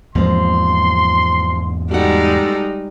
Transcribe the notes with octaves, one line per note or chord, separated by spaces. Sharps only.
E2 G#2 F3 A#3 C4 C6
G3 G#3 D#4 F#4 A4 F#5